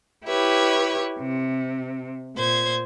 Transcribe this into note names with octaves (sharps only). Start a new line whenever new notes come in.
E4 G4 B4 C#5
C3
A#2 C5 G#6